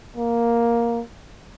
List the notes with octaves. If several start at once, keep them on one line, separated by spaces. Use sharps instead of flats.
A#3